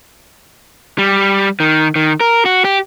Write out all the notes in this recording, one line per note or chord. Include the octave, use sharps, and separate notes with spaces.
G3
D#3
D#3
A#4
F#4
G4